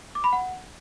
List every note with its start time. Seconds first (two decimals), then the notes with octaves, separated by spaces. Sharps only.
0.15 D6
0.24 B5
0.33 F#5